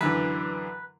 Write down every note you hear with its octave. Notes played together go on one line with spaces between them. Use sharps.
F#2 D3 E3 B4